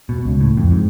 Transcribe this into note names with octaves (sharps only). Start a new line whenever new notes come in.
B2
C#2
A2
F2
G#2